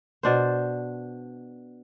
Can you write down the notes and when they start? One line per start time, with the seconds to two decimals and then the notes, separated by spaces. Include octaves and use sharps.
0.23 B2 D4 C5